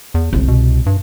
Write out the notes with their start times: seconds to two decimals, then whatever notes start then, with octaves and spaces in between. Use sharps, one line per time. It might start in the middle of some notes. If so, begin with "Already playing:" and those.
0.14 E2
0.33 G1 C2
0.48 B2
0.86 G2